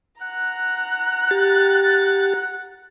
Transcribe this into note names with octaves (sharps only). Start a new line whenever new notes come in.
F#5 A#5 F#6
G4 A6